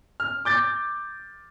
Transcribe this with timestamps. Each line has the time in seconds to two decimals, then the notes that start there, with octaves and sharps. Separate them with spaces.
0.20 F6
0.45 D6 G6 A6